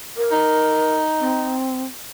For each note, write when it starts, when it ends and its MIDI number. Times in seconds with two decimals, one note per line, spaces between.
0.17 0.97 70
0.32 1.57 63
1.20 1.83 60